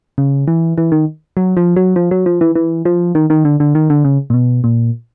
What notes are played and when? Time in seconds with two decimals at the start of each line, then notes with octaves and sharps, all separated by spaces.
0.18 C#3
0.48 E3
0.78 E3
0.92 D#3
1.37 F#3
1.57 F3
1.76 F#3
1.96 F3
2.11 F#3
2.26 F3
2.41 E3
2.55 E3
2.85 F3
3.15 D#3
3.30 D#3
3.45 D3
3.60 D3
3.75 D#3
3.90 D3
4.05 C#3
4.30 A#2
4.34 B2
4.64 A#2